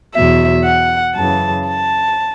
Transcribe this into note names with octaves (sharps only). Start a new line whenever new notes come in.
E2 B2 F#3 E5
F#5
F#2 C#3 E3 A5
A5